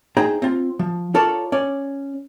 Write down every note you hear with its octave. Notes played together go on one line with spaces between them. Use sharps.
D#4 G#4 C5 G5 A#5
C4 F4
F3
F4 A4 A#4 C#5 D5
C#4 D5